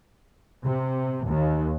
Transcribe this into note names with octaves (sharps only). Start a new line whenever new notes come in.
C3
D#2